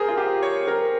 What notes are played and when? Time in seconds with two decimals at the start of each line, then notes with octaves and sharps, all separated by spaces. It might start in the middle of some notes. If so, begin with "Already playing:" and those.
Already playing: G#4 A#4 C5
0.08 F4
0.18 G4
0.43 C#5
0.67 A#4